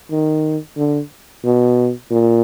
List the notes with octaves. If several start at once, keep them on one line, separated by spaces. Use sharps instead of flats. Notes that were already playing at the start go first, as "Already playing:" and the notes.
D#3
D3
B2
A#2